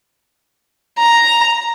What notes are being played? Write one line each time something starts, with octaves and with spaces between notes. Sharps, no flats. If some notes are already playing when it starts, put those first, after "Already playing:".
A#5